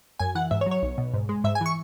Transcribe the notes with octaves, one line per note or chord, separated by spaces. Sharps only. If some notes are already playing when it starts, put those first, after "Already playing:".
F#2 G#5
E3 F#5
G#2 E5
C#5
F#3
C#5
B1
B2
G#2
G#3
G#2 E5
G#5
E3 C#6